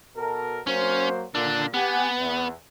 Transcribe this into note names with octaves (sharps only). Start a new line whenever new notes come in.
B2 A4 A#4
F#3 A#3 C#4 C5
A#2 D3 D4
B3 G4 F#5 G#5
E2